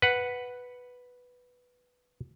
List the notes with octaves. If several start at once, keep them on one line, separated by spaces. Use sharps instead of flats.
B4 F#5